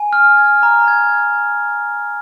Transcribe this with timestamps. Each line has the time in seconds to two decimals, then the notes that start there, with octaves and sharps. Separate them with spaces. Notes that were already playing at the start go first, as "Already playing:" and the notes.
Already playing: G#5
0.13 F6
0.37 G#6
0.63 A#5
0.88 G#6